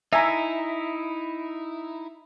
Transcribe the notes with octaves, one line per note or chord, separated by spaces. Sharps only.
D#4 E4 E5 G#5 A#5